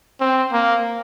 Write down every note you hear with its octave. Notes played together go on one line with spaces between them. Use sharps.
C4
A#3